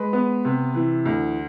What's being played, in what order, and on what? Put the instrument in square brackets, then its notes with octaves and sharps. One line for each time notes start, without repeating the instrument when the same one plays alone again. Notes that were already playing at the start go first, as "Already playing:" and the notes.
Already playing: [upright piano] G#3 B4
B3
C3
E3
D2